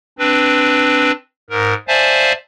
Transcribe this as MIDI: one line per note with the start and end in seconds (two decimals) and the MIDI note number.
0.19 1.12 60
0.19 1.12 62
0.19 1.12 71
1.50 1.74 44
1.50 1.74 70
1.88 2.33 72
1.88 2.33 74
1.88 2.33 76
1.88 2.33 77
1.88 2.33 80
1.88 2.33 81